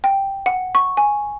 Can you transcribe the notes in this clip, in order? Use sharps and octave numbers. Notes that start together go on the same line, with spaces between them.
G5
F#5
C#6
G#5